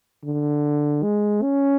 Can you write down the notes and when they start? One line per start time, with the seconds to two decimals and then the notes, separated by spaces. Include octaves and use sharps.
0.24 D3
1.03 G#3
1.43 C#4